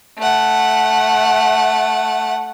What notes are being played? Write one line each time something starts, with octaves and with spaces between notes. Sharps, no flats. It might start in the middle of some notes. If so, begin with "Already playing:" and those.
A3 F#5